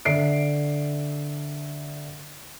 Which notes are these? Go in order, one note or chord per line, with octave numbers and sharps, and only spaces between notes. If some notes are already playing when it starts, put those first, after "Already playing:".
D3 E5 C7 D7